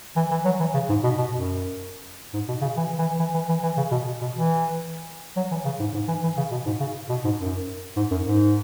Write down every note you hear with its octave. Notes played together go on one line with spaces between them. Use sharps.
E3
E3
F#3
E3
C#3
G#2
B2
B2
F#2
G#2
B2
C#3
E3
E3
E3
E3
E3
E3
C#3
B2
B2
E3
F#3
E3
C#3
G#2
G#2
E3
E3
C#3
B2
G#2
C#3
B2
G#2
F#2
G#2
F#2
G#2